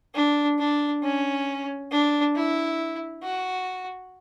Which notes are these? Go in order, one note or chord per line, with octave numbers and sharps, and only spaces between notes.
D4
D4
C#4
D4
E4
F#4